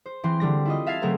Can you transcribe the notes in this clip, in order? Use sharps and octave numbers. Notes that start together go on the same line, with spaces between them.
C5
E3 C4 C6
D3 G3 A#6
E4 F4 D#5
E5 F5 A5 G#6 C7
C#3 F#3 A3 C4 A#4